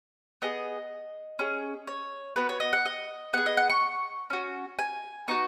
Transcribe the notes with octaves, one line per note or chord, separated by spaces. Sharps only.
B3 G#4 D#5
C#4 G#4
C#5
B3 F#4 B4
C#5
D#5
F#5
D#5
B3 G#4 F#5
D#5
F#5
C#6
C#4 F#4
G#5
B3 D#4 F#4 C#6